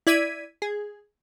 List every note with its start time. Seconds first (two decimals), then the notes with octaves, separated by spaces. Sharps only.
0.07 E4 D5 G#6 B6 D#7
0.62 G#4